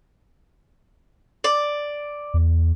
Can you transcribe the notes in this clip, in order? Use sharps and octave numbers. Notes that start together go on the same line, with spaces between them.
D5
E2